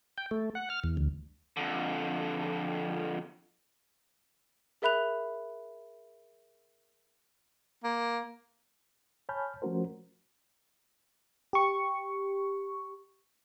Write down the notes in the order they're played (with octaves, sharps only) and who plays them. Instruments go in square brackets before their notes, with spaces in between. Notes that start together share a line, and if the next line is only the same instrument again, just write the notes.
[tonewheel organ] G5
A3
F#5
F6
E2
D2
[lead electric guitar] F2 D3
[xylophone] G#4 A#4 E5 B5 F#6 F7
[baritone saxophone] A#3
[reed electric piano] C#5 G#5 A5 B5 F6 G6
F3 A3 C#4 F#4 A#4 C5
[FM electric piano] G4 C#6